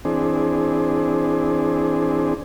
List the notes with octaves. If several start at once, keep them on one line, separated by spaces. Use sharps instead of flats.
E3 C4 D4 G#4